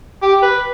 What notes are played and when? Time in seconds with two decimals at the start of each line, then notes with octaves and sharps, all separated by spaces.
0.22 G4
0.42 B4